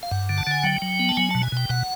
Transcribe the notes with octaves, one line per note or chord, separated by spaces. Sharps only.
F5
G2 F#5
D3
A5
D3 G#5
F#3 G5
F#3
B3
A5
F#3 G#5
B2 A5
G#5
B2 G5
B2 F#5